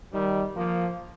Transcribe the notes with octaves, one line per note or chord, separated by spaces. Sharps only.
D#3 G3
F3 A#3